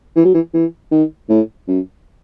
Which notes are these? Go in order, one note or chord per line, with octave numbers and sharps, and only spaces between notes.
E3
F#3
E3
E3
D#3
A2
F#2